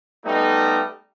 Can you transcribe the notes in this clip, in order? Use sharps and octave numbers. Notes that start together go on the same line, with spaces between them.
G3 A3 B3 D#4